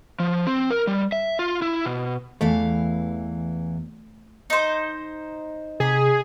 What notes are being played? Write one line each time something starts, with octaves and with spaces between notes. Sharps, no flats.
F3
C4
A#4
G3
E5
F4
E4
B2
E2 E3 A3 F5
D#4 C5
C3 G#4 B6